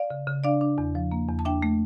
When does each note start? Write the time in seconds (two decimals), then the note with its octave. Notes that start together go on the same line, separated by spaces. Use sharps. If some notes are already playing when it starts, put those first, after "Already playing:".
Already playing: D5 F5
0.10 C#3
0.27 C#3
0.44 D4 D5 F5
0.61 D4
0.78 E2
0.95 F3
1.12 A#3
1.28 E2
1.39 A5
1.45 D4 E5 G5
1.62 A3